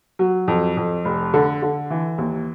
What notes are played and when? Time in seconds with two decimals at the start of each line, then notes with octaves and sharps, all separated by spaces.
0.19 F#3
0.48 F2
0.77 F2
1.05 F1
1.34 D3
1.62 D3
1.90 E3
2.18 D#2